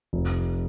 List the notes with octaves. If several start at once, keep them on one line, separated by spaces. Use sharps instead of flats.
F1